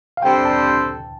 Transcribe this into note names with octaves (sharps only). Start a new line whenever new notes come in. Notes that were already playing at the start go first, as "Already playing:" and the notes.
F5
C3 G3 D4 A4 C5 G5
A5